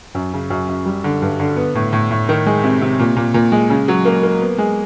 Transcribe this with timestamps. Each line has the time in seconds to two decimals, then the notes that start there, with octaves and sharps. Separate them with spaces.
0.15 F#2
0.34 C#3
0.50 F#2
0.69 F#2
0.86 G3
1.04 D3
1.22 G2
1.40 D3
1.57 B3
1.75 A2
1.93 A2
2.11 A2
2.29 D#3
2.46 G#3
2.64 C3
2.81 C3
2.99 A#2
3.16 A#2
3.34 A#2
3.52 G#3
3.70 C#3
3.88 F#3
4.05 A#3
4.23 A#3
4.41 B3
4.58 G#3